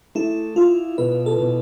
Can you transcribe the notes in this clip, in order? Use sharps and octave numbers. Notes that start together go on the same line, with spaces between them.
A3 E4
E4 F4
B2 B4
A4
B2